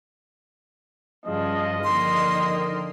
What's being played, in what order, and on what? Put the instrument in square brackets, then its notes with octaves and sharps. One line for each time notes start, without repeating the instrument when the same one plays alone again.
[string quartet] G2 C#3 F3 [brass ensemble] D#5
[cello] D3 F3 [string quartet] D#3 A#3 [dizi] C6